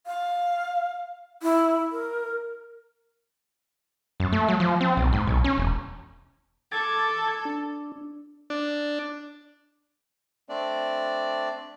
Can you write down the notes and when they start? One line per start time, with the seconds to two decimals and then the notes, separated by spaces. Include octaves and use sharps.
0.07 F5
1.43 E4
1.92 A#4
4.20 F#2
4.32 A3
4.48 F#3
4.60 F3
4.81 C4
4.97 B1
5.13 G#2
5.27 B1
5.44 C#4
5.58 E1
6.72 A4 D6 G#6 A6
7.45 D4
8.50 D4
10.49 A3 C4 D4 D5